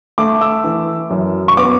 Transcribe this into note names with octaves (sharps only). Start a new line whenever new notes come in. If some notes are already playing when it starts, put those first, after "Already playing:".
A3 D6
E6
E3
F#2
C#6
B3 D6